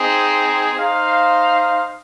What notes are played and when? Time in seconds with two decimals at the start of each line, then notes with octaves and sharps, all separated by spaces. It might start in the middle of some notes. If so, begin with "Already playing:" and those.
Already playing: C4 D#4 G#4
0.74 D#4 C5 F5